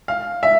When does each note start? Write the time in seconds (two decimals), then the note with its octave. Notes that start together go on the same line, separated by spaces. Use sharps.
0.08 F5
0.43 E5